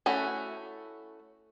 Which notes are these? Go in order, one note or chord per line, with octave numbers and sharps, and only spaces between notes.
A3 C#4 E4 F#4